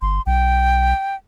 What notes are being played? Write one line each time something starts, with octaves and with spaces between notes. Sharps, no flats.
G1 C6
B1 G5